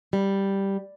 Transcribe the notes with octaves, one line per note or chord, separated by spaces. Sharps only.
G3